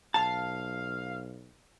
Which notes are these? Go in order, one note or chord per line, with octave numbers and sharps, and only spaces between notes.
B1 F5 A5